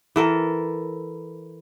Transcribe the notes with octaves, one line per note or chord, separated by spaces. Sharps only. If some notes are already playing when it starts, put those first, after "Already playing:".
E3 A4 A#4